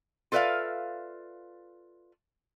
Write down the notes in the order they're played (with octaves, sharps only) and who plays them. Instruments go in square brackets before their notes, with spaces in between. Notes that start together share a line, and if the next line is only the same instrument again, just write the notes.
[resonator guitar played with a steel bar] F4 A4 B4 D5 E5 F5